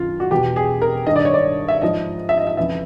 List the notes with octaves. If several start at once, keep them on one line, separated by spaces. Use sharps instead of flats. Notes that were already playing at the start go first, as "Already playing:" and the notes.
Already playing: F#2 D#3 F4
F#4
E2 B2 G4
G#4
A#4
G2 D#3 D#5
D5
C#5
D5
E5
G#2 F3 D#5
E5
D#5
E5
F2 C#3 E3 E5